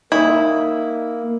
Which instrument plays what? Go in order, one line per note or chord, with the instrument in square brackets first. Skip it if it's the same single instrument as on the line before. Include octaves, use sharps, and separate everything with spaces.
[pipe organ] A#3 [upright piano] D#4 D#6 [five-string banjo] E4